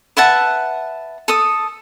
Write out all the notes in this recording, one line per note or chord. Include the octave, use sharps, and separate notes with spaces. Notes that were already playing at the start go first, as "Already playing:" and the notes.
B4 E5 F#5 A5
A4 D#6